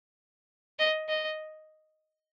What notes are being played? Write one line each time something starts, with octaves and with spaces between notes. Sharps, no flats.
D#5
D#5